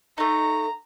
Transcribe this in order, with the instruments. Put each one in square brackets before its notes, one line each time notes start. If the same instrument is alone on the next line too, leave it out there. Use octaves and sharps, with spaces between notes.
[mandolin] A3 D#4 [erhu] A#5